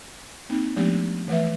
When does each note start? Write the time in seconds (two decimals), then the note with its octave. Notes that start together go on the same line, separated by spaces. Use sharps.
0.50 A#3 C4 D#4
0.76 F3 G#3 A3 B3 D4 G4
1.28 E3 A3 B4 E5